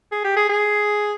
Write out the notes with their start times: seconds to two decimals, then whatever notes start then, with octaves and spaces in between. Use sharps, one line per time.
0.12 G#4
0.24 G4
0.36 G#4
0.49 G#4